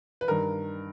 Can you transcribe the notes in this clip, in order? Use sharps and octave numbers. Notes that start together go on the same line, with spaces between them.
B4
G2 D#3 A#4